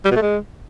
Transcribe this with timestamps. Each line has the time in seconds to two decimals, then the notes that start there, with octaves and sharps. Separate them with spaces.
0.05 G3
0.11 B2
0.16 A3
0.22 G#3